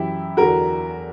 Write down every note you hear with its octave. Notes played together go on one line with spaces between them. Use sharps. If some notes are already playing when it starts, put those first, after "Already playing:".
Already playing: F#2 E3 E4 G4
E2 D3 F#3 F#4 A#4